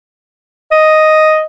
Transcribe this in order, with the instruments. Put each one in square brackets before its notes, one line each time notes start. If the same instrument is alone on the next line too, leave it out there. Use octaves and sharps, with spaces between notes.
[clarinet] D#5